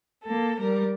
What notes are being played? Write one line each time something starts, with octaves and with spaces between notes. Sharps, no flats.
A#3 A4
G3 A#4